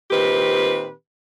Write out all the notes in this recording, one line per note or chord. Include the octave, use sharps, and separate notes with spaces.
A#2 D#3 C4 G4 B4